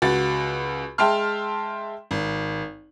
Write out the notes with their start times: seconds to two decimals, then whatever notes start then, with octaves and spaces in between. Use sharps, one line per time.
0.02 C#2 F#4 A6
0.98 G#3 E5 G5 A5 C6 F6
2.11 G#1